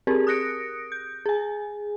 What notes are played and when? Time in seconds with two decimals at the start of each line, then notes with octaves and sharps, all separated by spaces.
0.07 C4 G4 G#4 A#4
0.27 D#6 F#6 A#6 C#7 D7
0.92 G6
1.26 G#4 G#5